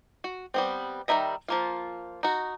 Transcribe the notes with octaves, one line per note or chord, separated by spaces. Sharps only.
F#4
G3 B3 C4
D#3 G3 D#4 E5 A#5
F3 A#3 F4
D#4 F#4